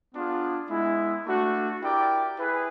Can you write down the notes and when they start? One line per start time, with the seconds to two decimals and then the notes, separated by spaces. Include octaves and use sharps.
0.14 B3 D4 F4 G#4
0.70 G#3 B3 E4
1.26 A3 D4 F#4
1.82 E4 G4 A#4 D5 G5
2.38 E4 G#4 B4